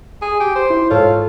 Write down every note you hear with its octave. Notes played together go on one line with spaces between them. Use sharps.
G#4
G4
C5
E4
G#2 F4 A4 C#5